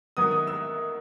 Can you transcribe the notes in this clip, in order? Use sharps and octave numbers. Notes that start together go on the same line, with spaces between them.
D#3 F#3 B3 D#6
D#6
E6